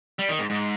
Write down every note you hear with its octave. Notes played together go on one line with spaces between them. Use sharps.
G3
D#3
G#2
G#2